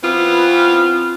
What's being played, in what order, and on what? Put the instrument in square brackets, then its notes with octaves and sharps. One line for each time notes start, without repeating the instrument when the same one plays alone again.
[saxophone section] E3 B3 C4 F4